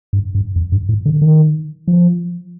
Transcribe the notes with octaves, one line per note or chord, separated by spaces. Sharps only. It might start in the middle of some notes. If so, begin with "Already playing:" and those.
G2
G2
F2
G2
A2
D3
D#3
F3